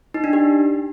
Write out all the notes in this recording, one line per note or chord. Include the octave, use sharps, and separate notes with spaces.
D#4
D4
G4